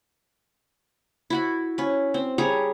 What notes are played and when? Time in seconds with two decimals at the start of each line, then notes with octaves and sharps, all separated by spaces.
1.30 E4 F#4 B5
1.78 C#4 B4
2.14 C4
2.38 G3 G#4 C#5 A#5